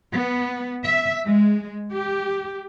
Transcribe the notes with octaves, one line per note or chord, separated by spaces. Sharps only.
B3
E5
G#3
G4